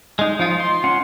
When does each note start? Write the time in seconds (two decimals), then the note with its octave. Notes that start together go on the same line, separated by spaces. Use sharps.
0.19 G#3 D#4
0.39 F3 D#4 F4
0.60 C6
0.84 C#4 F4 F#5